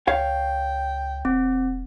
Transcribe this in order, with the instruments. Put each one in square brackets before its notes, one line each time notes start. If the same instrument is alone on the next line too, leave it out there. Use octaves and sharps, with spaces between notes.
[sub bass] C#2 [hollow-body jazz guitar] C#5 F5 [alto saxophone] G5
[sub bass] E1 [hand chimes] C4